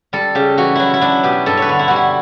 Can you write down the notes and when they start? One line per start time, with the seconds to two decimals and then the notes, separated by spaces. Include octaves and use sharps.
0.13 G3 A4
0.35 C#3 G4
0.57 E3 F#4
0.75 F#3 E4 F#4
0.93 E4
1.01 F#3 D4
1.24 B2 G4
1.46 G2 A4
1.57 B4 C#5
1.69 D3
1.79 E4
1.88 G3 F#4
1.96 E4